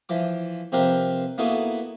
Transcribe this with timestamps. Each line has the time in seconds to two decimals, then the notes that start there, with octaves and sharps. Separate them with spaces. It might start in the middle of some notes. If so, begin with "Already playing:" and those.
0.09 E3 F3 D6
0.72 C3 F3 C4 G4 A#4 B4
1.38 A#3 B3 D#4 E4 F#4 A4